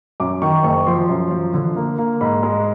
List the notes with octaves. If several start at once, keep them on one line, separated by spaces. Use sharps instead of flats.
F#2 D6
D#3 C#6
F#1 C#6
F3 C6
F#2
F3
D3
A#3
A#3
G#2 B5
G#3